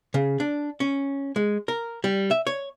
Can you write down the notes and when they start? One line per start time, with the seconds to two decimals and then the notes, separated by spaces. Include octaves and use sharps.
0.14 C#3
0.40 D4
0.80 C#4
1.36 G#3
1.68 A#4
2.04 G3
2.31 E5
2.47 C#5